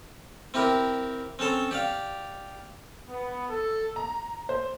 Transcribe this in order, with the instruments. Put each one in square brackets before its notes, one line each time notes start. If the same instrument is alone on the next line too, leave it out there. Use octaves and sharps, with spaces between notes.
[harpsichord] C4 E4 G4 A#4
C4 C#4 A4 A5 C6
G4 D5 F5
[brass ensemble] B3
A4
[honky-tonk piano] A#5
C5